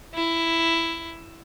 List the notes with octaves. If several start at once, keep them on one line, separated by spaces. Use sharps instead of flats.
E4